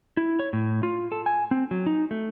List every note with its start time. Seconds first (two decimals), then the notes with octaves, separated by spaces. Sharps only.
0.17 E4
0.39 C#5
0.53 A2
0.83 F4
1.12 A4
1.26 G#5
1.51 C4
1.71 F#3
1.86 D#4
2.11 A3